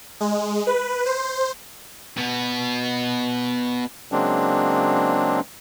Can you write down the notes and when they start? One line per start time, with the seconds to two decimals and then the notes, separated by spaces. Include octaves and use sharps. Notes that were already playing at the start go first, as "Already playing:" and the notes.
0.21 G#3
0.67 B4
1.06 C5
2.17 B2 B3
4.12 C#3 F#3 G#3 A#3 C4 D4